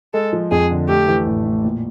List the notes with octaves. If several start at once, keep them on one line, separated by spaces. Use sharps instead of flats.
G#3 A4
F3
F2 G#4
D3
A3 G4
E3
A1
A2
A#2